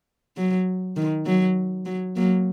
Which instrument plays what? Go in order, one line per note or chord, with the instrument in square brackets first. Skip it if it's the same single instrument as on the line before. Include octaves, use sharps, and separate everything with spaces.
[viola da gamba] F#3
D#3
F#3
F#3
F#3 A#3